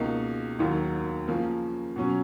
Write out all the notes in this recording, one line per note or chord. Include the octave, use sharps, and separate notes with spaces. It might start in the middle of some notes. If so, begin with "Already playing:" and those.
Already playing: C#2 B2 A#3 D#4
D#2 D#3 F#3
C#3 F3 A#3 C#4
B2 F#3 C#4